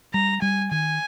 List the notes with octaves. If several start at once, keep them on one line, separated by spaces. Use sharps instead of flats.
G3 A#5
G3 G#5
D#3 G#5